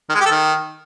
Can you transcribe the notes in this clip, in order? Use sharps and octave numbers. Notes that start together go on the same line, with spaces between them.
D#3
G#3
G4
A4
D#3